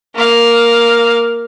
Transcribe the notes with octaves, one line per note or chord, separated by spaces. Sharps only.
A#3 F5